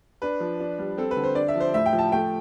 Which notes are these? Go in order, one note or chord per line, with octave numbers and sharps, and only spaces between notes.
D4 B4
F3
D4
G3
C4 A4
B4
D3
C5
D4 D5
E5
F3
C5
A2 E5
G5
F3
A5
A3 G5